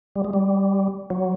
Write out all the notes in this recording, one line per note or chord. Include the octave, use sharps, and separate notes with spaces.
G3
G#3
G3
F#3